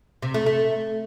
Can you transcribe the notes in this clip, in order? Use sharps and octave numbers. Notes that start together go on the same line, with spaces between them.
C3
A3
A3